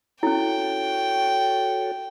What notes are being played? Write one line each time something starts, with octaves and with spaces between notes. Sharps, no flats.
C#4 E4 F#4 A4 C#5 G5